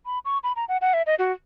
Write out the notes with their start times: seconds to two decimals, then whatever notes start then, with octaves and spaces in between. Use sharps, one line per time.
0.06 B5
0.25 C#6
0.43 B5
0.56 A#5
0.68 F#5
0.81 F#5
0.93 E5
1.06 D#5
1.19 F#4